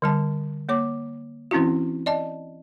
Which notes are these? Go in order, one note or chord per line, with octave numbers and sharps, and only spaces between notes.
D3 G3 A5
A#3 C#5 D6
E3 C4 C#4 E4 F#4
D5 D#5 A5